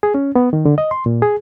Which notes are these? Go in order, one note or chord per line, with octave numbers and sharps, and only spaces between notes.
G#4
C#4
B3
D#3
D3
D#5
C6
A#2
G#4